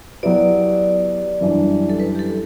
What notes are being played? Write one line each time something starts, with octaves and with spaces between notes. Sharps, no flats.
F#3 B3 E4 G4 B4 D5
F#2 E3 G3 D4
A4
B4
G4
A4